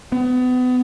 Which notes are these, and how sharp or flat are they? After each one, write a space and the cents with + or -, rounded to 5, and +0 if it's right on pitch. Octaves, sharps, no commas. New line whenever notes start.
B3 +30